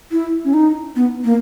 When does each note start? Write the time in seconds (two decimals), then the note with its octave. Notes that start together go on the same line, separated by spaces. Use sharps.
0.12 E4
0.45 C#4
0.54 D#4
0.96 B3
1.24 A#3